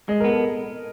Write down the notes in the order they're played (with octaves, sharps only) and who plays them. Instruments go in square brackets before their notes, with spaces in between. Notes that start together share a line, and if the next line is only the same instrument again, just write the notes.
[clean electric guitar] G#3 [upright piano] D#5
[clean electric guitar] B3 [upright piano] A#4
[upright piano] A4